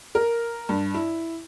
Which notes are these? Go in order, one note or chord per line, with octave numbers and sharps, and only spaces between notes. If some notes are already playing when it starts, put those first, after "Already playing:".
A#4
G2
E4